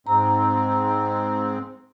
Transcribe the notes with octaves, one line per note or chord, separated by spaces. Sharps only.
G#2 C4 A#5